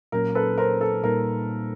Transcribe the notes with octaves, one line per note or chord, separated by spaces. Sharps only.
A#2 F#3 A#3 C#4 A#4
A4 B4
A#4 C5
A4
A#2 G3 A#3 D#4 A#4